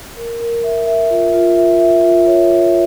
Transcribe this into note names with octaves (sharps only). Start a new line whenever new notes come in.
A#4
A#4
E5
E5
F4
F4
E5
E5
F4
C#5
C#5